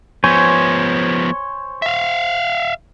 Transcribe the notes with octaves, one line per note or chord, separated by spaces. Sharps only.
F3 B3 C5 C#5 G#5
E5 F5